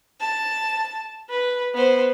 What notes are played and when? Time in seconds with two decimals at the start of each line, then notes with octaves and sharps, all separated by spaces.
0.20 A5
1.29 B4
1.74 B3 C5